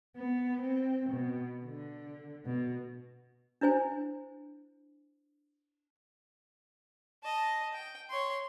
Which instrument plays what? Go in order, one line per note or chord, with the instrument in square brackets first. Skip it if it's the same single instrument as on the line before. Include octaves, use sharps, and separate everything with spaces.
[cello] B3
C4
B2
D3
B2
[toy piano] D4 E4 C5 G#5
[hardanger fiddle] D#5 A5
G5
C#5 C6